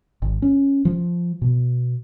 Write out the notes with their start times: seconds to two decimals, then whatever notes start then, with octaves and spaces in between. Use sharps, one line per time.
0.22 G#1
0.42 C#4
0.85 F3
1.42 B2